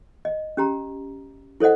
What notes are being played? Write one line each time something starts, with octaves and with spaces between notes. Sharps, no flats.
D#5
C#4 G4 A#5
E4 A4 C5 D#5 F#5